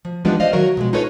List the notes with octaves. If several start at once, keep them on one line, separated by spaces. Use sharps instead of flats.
F3
E3 F3 G3 G#3 B3 D4
C5 D5 D#5 F5
D#3 F#3 F#4 A#4 C#5 E5
B2 F3 G#3
D#4 F4 G#4 A4 B4 C#5